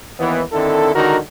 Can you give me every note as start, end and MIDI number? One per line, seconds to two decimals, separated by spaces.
0.19 0.42 39
0.19 0.42 52
0.19 0.42 59
0.53 0.92 50
0.53 0.92 51
0.53 0.92 60
0.53 0.92 64
0.53 0.92 69
0.95 1.18 37
0.95 1.18 50
0.95 1.18 51
0.95 1.18 63
0.95 1.18 66
0.95 1.18 70